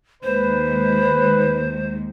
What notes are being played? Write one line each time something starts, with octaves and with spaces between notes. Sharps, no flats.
D#2 D#3 G#3 B4 C5